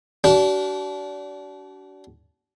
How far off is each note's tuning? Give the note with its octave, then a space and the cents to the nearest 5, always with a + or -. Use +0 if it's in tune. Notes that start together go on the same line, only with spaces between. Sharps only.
D4 -30 F#4 +45